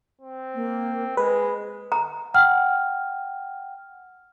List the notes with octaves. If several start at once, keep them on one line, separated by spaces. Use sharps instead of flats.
C4
A#3
G#3 G#4 B4
A#5
F#5 G5 F6